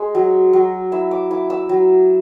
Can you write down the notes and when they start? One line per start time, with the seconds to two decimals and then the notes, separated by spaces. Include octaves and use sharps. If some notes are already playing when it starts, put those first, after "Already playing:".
Already playing: G#3
0.15 F#3
0.53 F#3
0.92 E4 E6
1.11 D6
1.31 E4 D6
1.50 E6
1.69 F#3